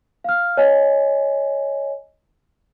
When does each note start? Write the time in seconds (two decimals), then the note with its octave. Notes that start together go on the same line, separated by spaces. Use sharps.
0.24 F5 F6
0.57 C#5 D#5 G#5